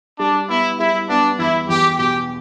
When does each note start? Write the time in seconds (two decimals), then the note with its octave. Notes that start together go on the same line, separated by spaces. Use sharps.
0.19 G3 D4
0.49 B3 E4
0.79 G3 E4
1.09 B3 D4
1.39 E2 E4
1.68 E2 G4
1.98 B2 G4